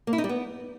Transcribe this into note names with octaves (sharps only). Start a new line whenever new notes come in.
A#3
E4
D#4
G3
B3